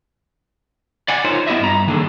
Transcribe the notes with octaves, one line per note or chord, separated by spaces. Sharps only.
D5 F#5 G#5
D#4 F4 A#4 C5 C#5
B3 E4 G4 D#5 E5
G2 A#5
D#3 A#3 D4 G#4 A4